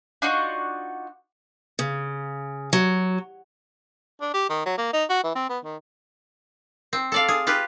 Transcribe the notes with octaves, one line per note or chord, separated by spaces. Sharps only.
D4 D#4 F4 F#4
C#3
F#3
D4
G4
D#3
F#3
A#3
D#4
F#4
E3
C4
B3
D#3
C4
A4 D5 F5
G#4
F4 G4 B4